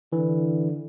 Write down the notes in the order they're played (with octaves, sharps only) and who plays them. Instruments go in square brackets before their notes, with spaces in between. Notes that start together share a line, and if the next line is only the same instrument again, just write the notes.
[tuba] D3 [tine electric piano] E3